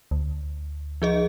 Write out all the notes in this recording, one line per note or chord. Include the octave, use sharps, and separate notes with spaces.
D2
F3 G#4 D#5